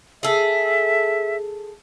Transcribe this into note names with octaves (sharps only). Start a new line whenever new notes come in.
G#4 A4 E5